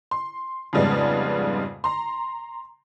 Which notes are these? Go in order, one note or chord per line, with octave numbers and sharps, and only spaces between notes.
C6
F2 G#2 C#3 G3 G#3 B3
A#5 C6